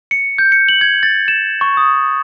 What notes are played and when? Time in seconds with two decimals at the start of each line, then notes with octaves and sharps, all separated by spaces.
0.11 C#7
0.38 G6
0.52 C#7
0.68 F#7
0.81 G#6
1.03 A6
1.28 E7
1.61 C#6
1.77 D#6